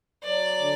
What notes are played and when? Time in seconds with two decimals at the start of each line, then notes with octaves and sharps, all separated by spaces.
0.24 F#3 D5
0.59 D3